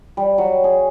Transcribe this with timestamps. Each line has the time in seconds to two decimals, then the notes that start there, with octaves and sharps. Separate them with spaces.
0.17 G3
0.38 F#3
0.64 G#4